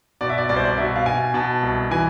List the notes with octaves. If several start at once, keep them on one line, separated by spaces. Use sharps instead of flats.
B2 D5
E5
D5
C2 D5
C5
D5
B2 E5
F5
B2 G#5
B2 A5
C2
E3 G#5